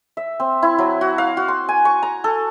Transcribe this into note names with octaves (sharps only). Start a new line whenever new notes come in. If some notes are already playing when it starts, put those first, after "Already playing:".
E5
C4
E4
F#3
F#4
F5
F#4
C6
G#5
C#6
A#5
A4